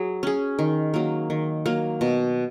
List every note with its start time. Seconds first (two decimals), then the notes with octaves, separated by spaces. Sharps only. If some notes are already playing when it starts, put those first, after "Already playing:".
Already playing: F#3 G#4
0.23 C#4 G#4
0.59 D#3
0.94 F#3 A#3
1.30 D#3
1.66 F#3 A#3
2.01 B2